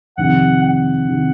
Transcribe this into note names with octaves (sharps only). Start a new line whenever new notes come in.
F2 C3 D#3 F#5
F#5
C3 D#3